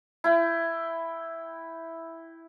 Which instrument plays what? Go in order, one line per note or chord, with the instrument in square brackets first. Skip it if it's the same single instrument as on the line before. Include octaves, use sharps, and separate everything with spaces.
[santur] E4 G5